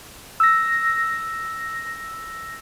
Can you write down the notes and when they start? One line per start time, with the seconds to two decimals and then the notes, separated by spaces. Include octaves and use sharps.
0.40 E6 A#6